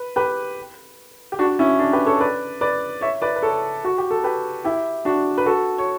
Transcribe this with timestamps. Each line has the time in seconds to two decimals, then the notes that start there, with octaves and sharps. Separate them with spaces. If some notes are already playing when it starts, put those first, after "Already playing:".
Already playing: B4
0.16 G4 B4
1.32 G4
1.39 D4 F#4
1.59 C#4 E4
1.79 D4
1.93 G4 B4
2.06 A4 C#5
2.21 B4 D5
2.61 B4 D5
3.01 C#5 E5
3.22 B4 D5
3.36 B4
3.42 A4 C#5
3.85 F#4
3.98 G4
4.11 A4
4.24 G4 B4
4.64 E4 G4
5.05 D4 F#4
5.38 B4
5.46 F#4 A4
5.78 C#5